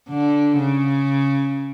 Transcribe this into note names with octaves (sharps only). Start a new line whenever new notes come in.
D3
C#3